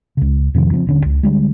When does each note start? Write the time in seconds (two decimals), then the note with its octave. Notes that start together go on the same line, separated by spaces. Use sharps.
0.17 C#2 C#3
0.54 F2 C3 D#3 F3
0.71 C#3 F3 A#3 C4
0.87 D#1 D3 C#4
1.06 C#2
1.23 D3 G3 G#3